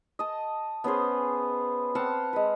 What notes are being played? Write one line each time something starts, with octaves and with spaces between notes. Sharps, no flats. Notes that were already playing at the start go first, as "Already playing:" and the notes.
D#5 A5
B3 C#4 G#4 C5
C4 F5 F#5 A5
G#3 B4